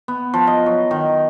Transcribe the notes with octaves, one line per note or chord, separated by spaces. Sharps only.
B3
F3
D#5
F#3
D#3